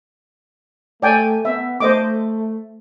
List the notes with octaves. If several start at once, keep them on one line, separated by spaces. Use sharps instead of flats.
A3 D5 G5 G#5
B3 E5
A3 C5 D#5 D6